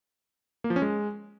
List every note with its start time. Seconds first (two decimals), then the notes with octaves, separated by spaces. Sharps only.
0.64 A#3
0.70 F3
0.76 C#4
0.82 G#3